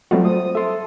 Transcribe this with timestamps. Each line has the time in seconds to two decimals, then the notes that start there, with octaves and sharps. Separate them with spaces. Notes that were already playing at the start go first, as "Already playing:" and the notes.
0.11 F#3 G3 A3 B3 C4 F4 F#4
0.24 C5 D#6
0.55 A4 E5 C6